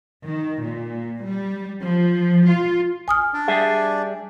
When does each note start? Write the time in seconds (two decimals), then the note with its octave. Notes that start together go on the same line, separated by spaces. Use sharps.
0.25 D#3
0.64 A#2
1.25 G3
1.81 F3
2.47 F4
3.08 G#5 D#6 F6
3.34 D4 D5
3.48 G3 G#4 E5